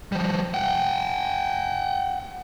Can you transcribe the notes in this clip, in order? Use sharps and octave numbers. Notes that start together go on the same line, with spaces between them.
F3 G3
F#5 G5